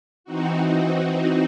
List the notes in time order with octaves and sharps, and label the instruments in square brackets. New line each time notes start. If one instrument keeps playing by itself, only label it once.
[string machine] E3 C4 D#4 F#4